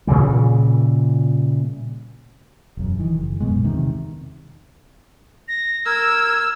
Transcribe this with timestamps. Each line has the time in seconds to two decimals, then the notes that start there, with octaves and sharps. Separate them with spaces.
0.07 A#2 C#3 E3 G3
2.77 E1 F#2
2.99 D#3 E3
3.15 F#1
3.40 A#1 F#2 B2 G#3
3.64 E2 C3 D#3
5.48 A#6
5.86 A#4 E6 G#6